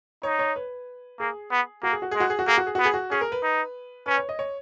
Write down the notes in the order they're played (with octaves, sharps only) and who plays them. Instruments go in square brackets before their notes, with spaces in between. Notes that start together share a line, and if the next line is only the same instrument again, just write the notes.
[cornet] D#4 [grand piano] C#5
[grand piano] C#5
B4
[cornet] A#3 [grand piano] G#4
[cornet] B3
[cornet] A#3 [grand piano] F#4
[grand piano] G#4
F#4
[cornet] G#3 [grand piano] G#4
[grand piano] F#4
G#4
F#4
[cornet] A#3 [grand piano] G#4
[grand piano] F#4
G#4
[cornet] B3 [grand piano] F#4
[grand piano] G#4
F#4
[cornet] C#4 [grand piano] G#4
[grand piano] A#4
B4
[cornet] D#4
[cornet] C#4 [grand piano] B4
[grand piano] C#5
D#5
C#5